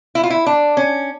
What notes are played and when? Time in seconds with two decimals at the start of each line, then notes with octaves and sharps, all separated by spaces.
0.15 E4
0.23 F4
0.30 E4
0.46 D4
0.77 C#4